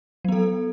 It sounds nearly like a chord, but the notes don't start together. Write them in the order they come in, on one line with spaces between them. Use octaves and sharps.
F#3 B3 A4